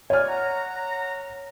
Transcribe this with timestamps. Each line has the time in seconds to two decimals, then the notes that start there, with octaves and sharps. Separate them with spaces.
0.10 C#5 D5 G#5 F6
0.28 F#5 A#5